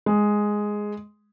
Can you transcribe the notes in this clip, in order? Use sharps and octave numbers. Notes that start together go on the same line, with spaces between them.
G#3